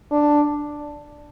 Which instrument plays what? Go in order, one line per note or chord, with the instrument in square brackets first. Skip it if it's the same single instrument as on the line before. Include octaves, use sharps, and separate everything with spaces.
[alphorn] D4